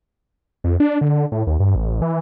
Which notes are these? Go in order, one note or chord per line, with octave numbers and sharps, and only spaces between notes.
F2
D4
D3
D3
A2
D#2
G2
A1
E3